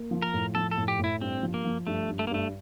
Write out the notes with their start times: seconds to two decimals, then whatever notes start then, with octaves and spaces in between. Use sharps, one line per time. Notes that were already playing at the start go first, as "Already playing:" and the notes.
Already playing: A#3
0.11 F3
0.22 A#4
0.34 A2
0.55 F3 A4
0.71 A4
0.78 A2
0.88 G4
0.99 A2 E4
1.21 G2 C4
1.43 F3
1.54 A#3
1.64 F3
1.87 G2 A3
2.08 G2
2.19 A3
2.27 A#3
2.31 G2 A3